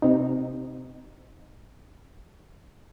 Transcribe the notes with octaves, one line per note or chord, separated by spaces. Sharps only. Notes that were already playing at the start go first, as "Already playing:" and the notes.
C3 D#4